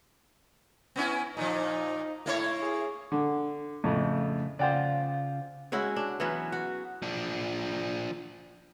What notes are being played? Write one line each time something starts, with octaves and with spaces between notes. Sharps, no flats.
B3 C#4 E4
A#2 F3 D#4
A2 A#3 E4 C#5
G#4
D3
F2 A2 C#3 F3 A3
C#3 F4 C5 D5 F#5 G5
G#3 C#4 E4 F#4
D4
E3 F#3 B3 C#4
F#4
F3 D4